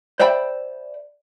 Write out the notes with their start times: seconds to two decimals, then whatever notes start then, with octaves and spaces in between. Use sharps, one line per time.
0.20 C5 D5 E5 G5 B5